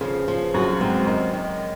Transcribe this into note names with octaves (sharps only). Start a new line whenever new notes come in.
C#3 F3
F3
F#2 F#4
G#2 C4
F#2 D#3
D#3